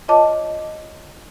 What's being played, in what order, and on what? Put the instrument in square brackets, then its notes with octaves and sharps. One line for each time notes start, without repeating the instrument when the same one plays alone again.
[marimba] F4 C#5 D#5 A5 D6